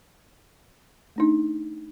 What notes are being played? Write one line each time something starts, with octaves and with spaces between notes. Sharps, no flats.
A3 D4 D#4